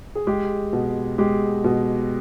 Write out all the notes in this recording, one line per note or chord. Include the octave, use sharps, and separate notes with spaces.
G#4
G#3 G4
B2
G#3 G4
B2